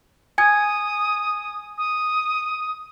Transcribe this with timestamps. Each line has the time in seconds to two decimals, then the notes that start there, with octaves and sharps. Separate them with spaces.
0.38 G#5 D#6 G#6
1.78 D#6